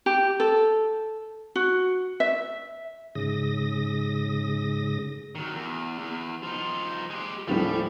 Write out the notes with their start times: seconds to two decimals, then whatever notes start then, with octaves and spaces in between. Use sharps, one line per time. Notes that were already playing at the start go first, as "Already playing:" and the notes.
0.06 G4
0.40 A4
1.56 F#4
2.20 E5
3.15 G#2 C#3 D#6 A#6
5.35 D#3 F#3
5.54 E2
5.99 E2
6.43 F3 D#4
7.10 G#3 G4
7.48 D#1 A2 F3 G3